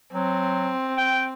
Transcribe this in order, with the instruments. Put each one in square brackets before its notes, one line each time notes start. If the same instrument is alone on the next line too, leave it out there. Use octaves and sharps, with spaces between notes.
[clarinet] F#3 [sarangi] C4
[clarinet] G5